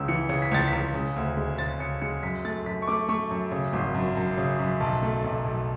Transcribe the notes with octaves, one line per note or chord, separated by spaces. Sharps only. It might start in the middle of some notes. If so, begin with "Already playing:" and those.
Already playing: C#2 C#3 E6
E3 C#7
C#3 C#7
B6
C#2 A6
B6
C#2
C#3
D2
G#3
C#3 A6
C#3 C#7
G#3 C#7
F#2 B6
A3 A6
F#2 B6
C#6
A3 D6
A3 C#6
F#2
C#3
G#1
F#2
F#2
C#3
F#2
B1 A5
A3
B1
B1